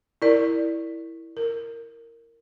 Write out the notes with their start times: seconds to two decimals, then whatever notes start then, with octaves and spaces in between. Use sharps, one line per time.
0.22 E4 A#4 D5
1.37 A#4